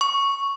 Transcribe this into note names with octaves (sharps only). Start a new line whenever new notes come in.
C#6